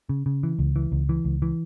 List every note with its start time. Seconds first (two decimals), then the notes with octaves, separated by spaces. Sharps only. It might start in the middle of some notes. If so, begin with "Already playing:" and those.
0.09 C#3
0.26 C#3
0.43 E3
0.59 C#2
0.76 E3
0.92 C#2
1.09 E3
1.25 C#2
1.42 E3